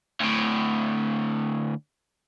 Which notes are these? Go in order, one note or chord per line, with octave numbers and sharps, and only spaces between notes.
D2 A2